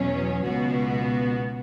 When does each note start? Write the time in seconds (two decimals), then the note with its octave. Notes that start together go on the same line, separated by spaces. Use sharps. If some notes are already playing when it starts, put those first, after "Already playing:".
Already playing: E2 B2 F#3 C#4
0.47 C#2 B2 B3 F#4